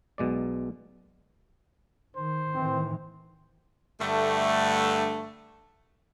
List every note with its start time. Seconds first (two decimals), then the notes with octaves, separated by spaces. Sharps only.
0.18 B1 B2 G#3 D5
2.16 D#3 C5
2.55 A2 D#3 E3 C4
4.01 G2 D3 A3